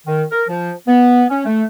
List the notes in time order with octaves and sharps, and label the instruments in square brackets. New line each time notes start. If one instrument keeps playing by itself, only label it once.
[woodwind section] D#3
A#4
F3
B3
C#4
A3